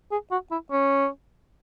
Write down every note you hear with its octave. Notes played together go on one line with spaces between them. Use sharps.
G#4
F#4
E4
C#4